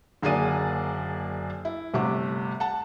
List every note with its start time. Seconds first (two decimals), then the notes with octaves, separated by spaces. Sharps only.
0.22 F#1 D3 A#3 G#4 D5 D#7
1.65 E4
1.94 G1 C3 A3 F#5 D6
2.60 F#5 A5